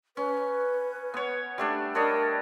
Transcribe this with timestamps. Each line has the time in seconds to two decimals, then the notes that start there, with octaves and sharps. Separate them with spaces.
0.17 C#4 B4
1.14 B3 C#5
1.58 G3 A3 D4
1.95 D4 A#4 C#5 D#5